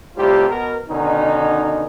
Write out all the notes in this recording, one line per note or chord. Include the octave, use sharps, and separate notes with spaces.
A2 C3 G3 C4 F4 G4
B2 A#4
B2 D3 D#3 C#4 D#4